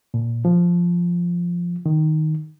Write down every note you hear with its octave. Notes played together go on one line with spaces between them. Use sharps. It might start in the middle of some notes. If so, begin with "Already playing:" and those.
A#2
F3
D#3